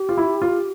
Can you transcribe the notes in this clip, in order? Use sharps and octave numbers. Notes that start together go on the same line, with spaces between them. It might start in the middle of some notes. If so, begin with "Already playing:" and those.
Already playing: G4
F4
E4
F4